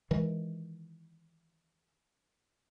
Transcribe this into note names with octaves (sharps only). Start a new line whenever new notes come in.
D#3 E3 G#3